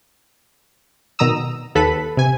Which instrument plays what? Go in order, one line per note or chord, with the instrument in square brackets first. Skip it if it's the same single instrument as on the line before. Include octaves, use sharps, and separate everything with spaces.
[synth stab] B2 D#3 A#5 D#6 E6
D#2 A4 B4 B5 B6
C3 G#5